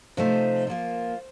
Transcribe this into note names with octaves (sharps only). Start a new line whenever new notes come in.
C3 F3 A3 D#4 C5
F3 A#3 F4